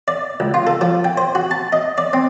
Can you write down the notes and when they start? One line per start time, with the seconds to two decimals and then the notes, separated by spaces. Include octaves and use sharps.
0.08 D5
0.40 C#2
0.54 F4
0.67 A4
0.81 F3
1.05 G5
1.17 C5
1.35 F#4
1.51 A5
1.73 D#5
1.98 D5
2.13 C4